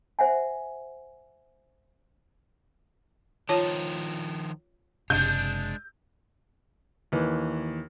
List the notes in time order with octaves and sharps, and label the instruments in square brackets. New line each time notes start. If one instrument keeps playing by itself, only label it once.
[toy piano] C5 E5 F#5 G#5
[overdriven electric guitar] D#3 F3 [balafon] F4 C#5 A5
[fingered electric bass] F#1 C3 [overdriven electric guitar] G#3 D4 [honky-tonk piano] G6
[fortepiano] D#2 E3